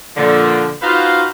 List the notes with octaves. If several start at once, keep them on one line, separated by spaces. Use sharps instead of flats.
A#2 D3 F3
D#4 F4 F#4 B4 C5 F5